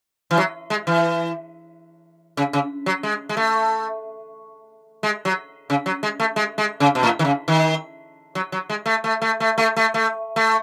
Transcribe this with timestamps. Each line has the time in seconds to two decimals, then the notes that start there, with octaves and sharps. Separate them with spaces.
0.31 E3
0.38 F#3
0.70 G#3
0.87 E3
2.37 C#3
2.53 C#3
2.86 F#3
3.03 G#3
3.29 G#3
3.37 A3
5.03 G#3
5.25 F#3
5.70 C#3
5.86 F#3
6.03 G#3
6.20 A3
6.36 G#3
6.58 G#3
6.80 C#3
6.95 B2
7.03 A2
7.19 D#3
7.25 C#3
7.48 D#3
8.35 F#3
8.52 F#3
8.69 G#3
8.86 A3
9.04 A3
9.22 A3
9.40 A3
9.58 A3
9.76 A3
9.94 A3
10.36 A3